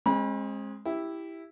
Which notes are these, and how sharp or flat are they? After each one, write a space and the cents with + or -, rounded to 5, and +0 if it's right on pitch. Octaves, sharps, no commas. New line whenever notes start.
G#3 +0 C4 +40 B5 -35
E4 +0 G4 +5